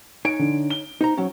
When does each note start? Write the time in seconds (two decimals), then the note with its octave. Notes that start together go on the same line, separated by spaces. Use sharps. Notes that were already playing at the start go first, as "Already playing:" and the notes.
0.25 D#4 C#5 G#5 D7
0.39 D3
0.70 G7
1.01 D#4 C5 A#5
1.17 F#3 C#4